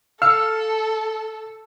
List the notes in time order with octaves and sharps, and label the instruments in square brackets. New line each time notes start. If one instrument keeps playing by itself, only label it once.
[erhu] A4 [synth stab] F5 F6 C#7 [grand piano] E6